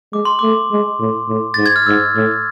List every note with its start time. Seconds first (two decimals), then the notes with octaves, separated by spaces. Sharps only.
0.13 G#3 D6
0.25 C6
0.39 A3 D6
0.72 G#3
1.00 A2
1.29 A2
1.54 G#2 A6
1.66 G#6
1.76 F6
1.86 G#2 E6
2.16 A2